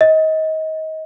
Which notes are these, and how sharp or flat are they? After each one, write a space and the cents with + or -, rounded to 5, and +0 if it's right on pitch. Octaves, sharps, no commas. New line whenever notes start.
D#5 +25